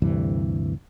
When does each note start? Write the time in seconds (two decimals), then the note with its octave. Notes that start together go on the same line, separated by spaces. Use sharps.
0.02 D2 G2 C3 E3